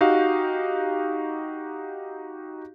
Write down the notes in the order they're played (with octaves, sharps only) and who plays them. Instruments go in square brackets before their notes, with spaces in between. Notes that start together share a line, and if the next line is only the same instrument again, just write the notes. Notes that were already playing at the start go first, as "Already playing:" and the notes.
[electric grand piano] D#4 F#4 G4 F5